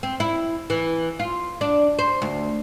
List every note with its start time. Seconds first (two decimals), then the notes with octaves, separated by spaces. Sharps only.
0.03 C4
0.20 E4
0.70 E3
1.19 F4
1.61 D4
1.99 C5
2.22 D2